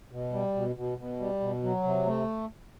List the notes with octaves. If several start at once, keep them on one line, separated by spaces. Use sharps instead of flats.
B2
G3
B2
B2
B2
G3
B2
F#3
C3
A3